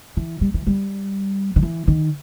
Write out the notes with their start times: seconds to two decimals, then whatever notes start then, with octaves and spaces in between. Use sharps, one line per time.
0.17 E3
0.41 G3
0.54 E3
0.67 G3
1.56 D#3
1.63 E3
1.88 D#3